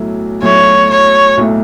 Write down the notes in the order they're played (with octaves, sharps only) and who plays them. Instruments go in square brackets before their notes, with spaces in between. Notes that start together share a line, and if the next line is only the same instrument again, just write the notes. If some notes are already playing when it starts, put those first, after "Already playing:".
Already playing: [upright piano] B1 A2 F#3 A3 E4
[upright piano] B1 A2 F#3 A3 E4 [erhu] C#5
[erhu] C#5
[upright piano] B1 A2 F#3 A3 E4